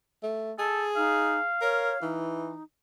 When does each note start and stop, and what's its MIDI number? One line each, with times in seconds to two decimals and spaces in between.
0.23 0.52 57
0.59 1.47 68
0.59 0.85 69
0.96 1.39 63
0.96 2.15 77
1.62 1.92 70
1.62 2.01 73
2.02 2.59 52
2.02 2.63 63